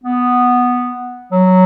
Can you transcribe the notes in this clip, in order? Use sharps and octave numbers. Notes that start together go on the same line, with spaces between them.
B3
F#3